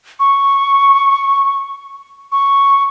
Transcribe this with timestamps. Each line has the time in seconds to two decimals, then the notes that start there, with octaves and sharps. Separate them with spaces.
0.20 C#6
2.32 C#6